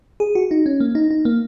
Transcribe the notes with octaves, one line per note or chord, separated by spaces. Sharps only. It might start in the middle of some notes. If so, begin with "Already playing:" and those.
G#4
F#4
D#4
C#4
A#3
D#4
D#4
A#3